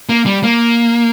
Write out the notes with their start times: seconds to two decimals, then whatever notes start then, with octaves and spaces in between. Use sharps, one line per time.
0.09 A#3
0.26 G3
0.43 A#3